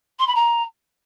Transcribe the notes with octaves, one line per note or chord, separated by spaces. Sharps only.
C6
B5
A#5